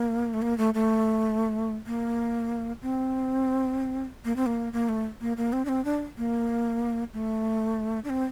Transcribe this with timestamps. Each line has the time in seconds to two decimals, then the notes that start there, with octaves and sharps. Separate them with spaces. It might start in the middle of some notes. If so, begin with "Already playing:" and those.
Already playing: A#3
0.34 A3
0.42 A#3
0.58 A3
0.74 A3
1.86 A#3
2.82 C4
4.25 A#3
4.36 C4
4.46 A#3
4.73 A#3
4.89 A3
5.21 A#3
5.37 A#3
5.53 C4
5.65 D4
5.69 C4
5.85 D4
6.18 A#3
7.13 A3
8.04 D4
8.09 C4